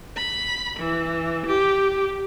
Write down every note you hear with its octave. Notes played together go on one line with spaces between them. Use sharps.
B5
E3
G4